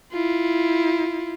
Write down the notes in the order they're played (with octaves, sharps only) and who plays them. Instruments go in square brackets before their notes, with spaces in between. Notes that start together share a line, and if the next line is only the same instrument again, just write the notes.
[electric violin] E4 F4